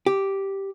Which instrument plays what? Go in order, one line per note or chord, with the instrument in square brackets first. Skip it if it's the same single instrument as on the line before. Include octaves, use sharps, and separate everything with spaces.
[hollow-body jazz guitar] G4